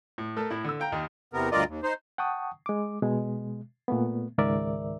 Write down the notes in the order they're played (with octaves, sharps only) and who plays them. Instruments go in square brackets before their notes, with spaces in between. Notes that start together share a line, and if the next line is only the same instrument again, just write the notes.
[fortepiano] A2
A3 A4 A#4
A2 E4
D3 E6
F5 G5 A#5
D#2 D#3
[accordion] E2 C3 B3 A#4
D2 G2 F4 A#4 D5 D#5
D#2
D#4 C5
[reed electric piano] F#5 G5 A5 C#6 D#6
G#3 D6
B2 G#3
A#2 A3 B3
C#2 G#2 D#3 A#4 D5 E5